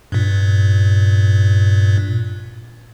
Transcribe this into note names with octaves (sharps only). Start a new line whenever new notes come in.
G2 A#2